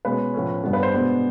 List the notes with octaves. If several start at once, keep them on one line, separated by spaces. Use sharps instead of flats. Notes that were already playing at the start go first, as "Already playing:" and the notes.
B2 G#3 C#4 B4
A2 F3 A3 C#4
G2 D3 G3 B3
B4
C5
B2 G#3 B3 D4